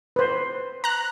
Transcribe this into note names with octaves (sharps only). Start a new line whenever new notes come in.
B4 C5
A#5 F#6